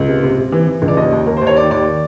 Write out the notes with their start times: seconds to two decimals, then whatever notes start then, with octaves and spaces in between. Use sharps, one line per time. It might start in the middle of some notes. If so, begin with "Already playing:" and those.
Already playing: C#2
0.08 C3
0.23 C3
0.38 C3
0.52 E3
0.67 E3
0.82 C#2
0.88 D5
0.97 D#2 D#5
1.12 D#2
1.26 D#2 A#4
1.37 C5
1.42 D#2
1.47 C#5
1.56 D#3 D5
1.71 D#2 D5